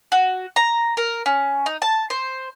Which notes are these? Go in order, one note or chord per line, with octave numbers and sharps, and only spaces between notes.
F#4
A#5
A#4
C#4
D#4
A5
C5